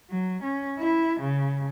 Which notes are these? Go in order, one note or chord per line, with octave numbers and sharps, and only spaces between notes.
F#3
C#4
E4
C#3